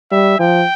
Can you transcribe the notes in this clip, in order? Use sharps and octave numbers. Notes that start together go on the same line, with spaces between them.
G3 E5
F3 G5